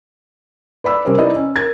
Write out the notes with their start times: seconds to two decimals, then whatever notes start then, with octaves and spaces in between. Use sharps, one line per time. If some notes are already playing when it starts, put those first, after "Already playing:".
0.84 B4 D5 B5 E6
1.05 C3 G3 C#4 G4 A#4 C5
1.18 D#4 E4 G4 B4 D5 D#5
1.36 C#4
1.56 A#4 G#6 A6